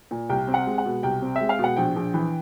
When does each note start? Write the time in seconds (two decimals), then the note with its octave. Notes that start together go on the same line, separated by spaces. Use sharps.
0.11 A#2
0.29 C2 G5
0.48 C4
0.54 F#5
0.67 G#3
0.78 F#5
0.85 B2
1.03 C2 G5
1.22 C4
1.36 E5
1.41 G#3
1.49 F5
1.59 B2 F#5
1.77 A#1 G5
1.96 A#1
2.14 E3